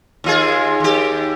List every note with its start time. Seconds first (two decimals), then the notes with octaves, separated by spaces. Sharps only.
0.24 D#2 F4 G#4
0.80 D#2 G4